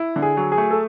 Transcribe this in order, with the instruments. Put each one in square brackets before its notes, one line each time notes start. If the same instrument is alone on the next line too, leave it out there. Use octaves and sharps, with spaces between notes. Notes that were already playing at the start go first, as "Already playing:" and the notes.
Already playing: [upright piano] E4
D3
[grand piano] G#4
[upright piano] F#3
[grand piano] G#4
[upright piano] A3
[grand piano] A4